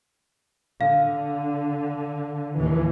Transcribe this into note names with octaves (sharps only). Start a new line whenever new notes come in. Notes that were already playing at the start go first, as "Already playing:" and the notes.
D3 F5
D#2 A2 E3